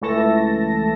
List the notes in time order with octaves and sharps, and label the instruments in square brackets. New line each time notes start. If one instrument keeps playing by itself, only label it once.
[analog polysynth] C#2 E3 A3 A4 A5 A#6